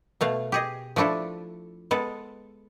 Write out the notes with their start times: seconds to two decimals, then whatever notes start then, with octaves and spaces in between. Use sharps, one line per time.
0.21 B2 A3 F5
0.52 G4 G#4 D#5
0.96 F3 A3 D4 E4 A4
1.91 G#3 B3 A4